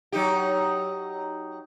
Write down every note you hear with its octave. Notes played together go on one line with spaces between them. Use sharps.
F#3 D#4 G4